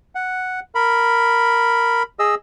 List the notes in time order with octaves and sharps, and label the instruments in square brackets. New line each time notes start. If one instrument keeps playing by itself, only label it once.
[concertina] F#5
A#4 B5
G#4 D#5 E6